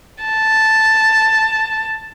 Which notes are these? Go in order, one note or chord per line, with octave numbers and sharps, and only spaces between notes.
A5